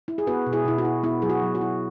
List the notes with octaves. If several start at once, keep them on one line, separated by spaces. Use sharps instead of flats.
E4
G#4
B3 F#4 B4
B2
E4 G#4
B2 E4
F#4
E4
B3 E4
F#3 G#4
F#4
F#3
F#4
E4